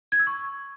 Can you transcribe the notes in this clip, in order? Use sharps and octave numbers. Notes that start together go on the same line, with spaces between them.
G#6
E6
C#6